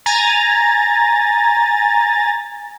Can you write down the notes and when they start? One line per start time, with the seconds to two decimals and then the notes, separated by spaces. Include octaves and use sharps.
0.06 G#5 A#5 A6